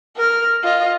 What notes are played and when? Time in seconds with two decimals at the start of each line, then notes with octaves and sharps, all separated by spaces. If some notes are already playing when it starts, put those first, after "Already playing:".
0.16 A#4 F6
0.63 F4 D#5